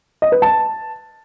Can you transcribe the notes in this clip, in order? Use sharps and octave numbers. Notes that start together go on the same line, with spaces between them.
D#5
B4
A5